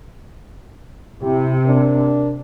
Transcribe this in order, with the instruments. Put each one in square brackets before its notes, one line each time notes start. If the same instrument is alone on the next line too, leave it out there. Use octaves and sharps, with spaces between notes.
[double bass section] C3 [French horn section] E4 G4
[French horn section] D4 A#4